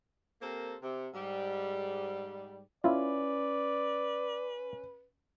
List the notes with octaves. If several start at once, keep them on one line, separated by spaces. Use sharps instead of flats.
A#3 C4 G4 A4 A#4 C5
C3
G#2 G3
C#4 E4 F4 B4 D5